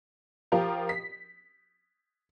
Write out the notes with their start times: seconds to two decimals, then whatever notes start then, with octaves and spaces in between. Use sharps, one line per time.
0.52 F3 F4 G4 A#4
0.89 B6